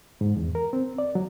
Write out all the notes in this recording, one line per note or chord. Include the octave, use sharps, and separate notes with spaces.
G#2
E2
A#4
C4
D5
F#3